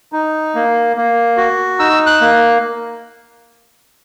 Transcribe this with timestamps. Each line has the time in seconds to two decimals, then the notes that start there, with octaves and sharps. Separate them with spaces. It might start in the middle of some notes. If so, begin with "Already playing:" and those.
0.12 D#4
0.55 A#3
0.97 A#3
1.37 F#4
1.79 D#4 E6
2.06 F#6
2.21 A#3